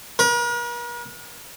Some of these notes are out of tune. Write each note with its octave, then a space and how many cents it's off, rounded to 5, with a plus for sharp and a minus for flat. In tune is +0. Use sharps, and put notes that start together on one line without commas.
A#4 +45